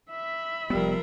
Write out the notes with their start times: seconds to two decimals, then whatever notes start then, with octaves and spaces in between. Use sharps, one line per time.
0.10 E5 B5
0.70 F1 F3 G3 B3 A#4